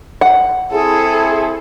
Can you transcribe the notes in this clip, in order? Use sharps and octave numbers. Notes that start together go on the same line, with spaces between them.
F#5
C4 E4 G#4 A4